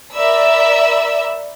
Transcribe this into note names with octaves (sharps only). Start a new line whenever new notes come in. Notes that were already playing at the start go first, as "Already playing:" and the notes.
A#4 D5 E5 B5 E6